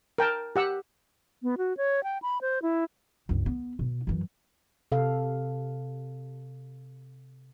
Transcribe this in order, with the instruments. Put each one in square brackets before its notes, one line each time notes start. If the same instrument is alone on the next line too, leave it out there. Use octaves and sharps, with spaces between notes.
[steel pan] A#4 G5 A5
G4 F#5 E6
[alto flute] B3
F#4
C#5
G5
B5
C5
E4
[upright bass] C#2 G2
B3
B2
F#2 E3
[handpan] C3 A4 F5